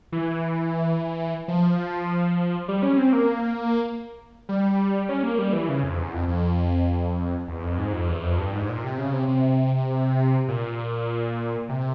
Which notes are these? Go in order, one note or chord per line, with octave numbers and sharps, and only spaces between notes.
E3
F3
G3
C#4
C4
A#3
G3
C#4
A#3
G3
E3
C#3
F2
E2
F2
F2
E2
F2
G#2
F2
E2
F2
G2
G#2
A#2
C3
C#3
C3
C3
A#2
C3